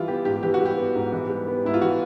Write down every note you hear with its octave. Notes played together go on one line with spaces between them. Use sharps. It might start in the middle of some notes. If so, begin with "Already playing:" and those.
Already playing: E3 G3 E4 F4
B3 G4
G#2 G4
E3 G4
F#4
G3
G4
B3
G#2
E3
G3
B3
G#2 E4
F4
E3 F#4